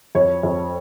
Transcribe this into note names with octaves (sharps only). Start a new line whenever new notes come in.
F2 C#5
F2